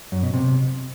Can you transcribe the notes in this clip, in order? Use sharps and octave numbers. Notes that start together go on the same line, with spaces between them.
F#2
B2
C3